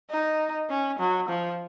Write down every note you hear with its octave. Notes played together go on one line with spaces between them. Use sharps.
D#4
C#4
F#3
F3